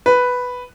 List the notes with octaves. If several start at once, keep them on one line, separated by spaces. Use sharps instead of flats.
B4